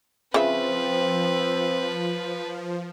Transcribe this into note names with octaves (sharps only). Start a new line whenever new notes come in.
C#3 F3 C4 F4 B4 E5